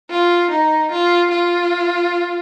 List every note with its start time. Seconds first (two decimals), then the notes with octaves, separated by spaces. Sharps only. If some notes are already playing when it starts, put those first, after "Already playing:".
0.10 F4
0.51 D#4
0.91 F4
1.31 F4